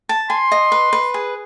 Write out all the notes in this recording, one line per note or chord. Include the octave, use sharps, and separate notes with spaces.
A5
G#5 C6
D#5
B4
B4
G#4